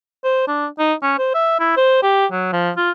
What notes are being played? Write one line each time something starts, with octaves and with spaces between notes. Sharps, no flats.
C5
D4
D#4
C#4
C5
E5
E4
C5
G4
F#3
F3
F4